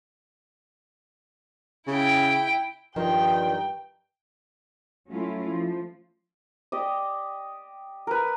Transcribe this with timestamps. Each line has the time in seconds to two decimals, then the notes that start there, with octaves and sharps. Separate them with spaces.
1.87 C#3 E4 G5
2.96 G2 D#3 F3 G5
5.10 F#3 A3 C#4 E4 F4
5.50 F3
6.72 G4 D5 D#5
8.07 A#4 B4